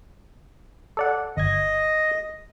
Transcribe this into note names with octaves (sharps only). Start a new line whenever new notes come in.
A4 D5 F#5
G1 D#5 G#6